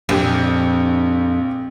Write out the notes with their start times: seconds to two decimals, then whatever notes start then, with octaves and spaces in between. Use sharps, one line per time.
0.09 A#1 F2 G4